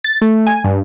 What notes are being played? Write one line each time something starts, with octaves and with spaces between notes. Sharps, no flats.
A6
A3
G#5
G2